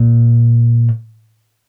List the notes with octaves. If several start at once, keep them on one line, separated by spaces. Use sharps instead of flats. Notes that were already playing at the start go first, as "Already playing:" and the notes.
Already playing: A#2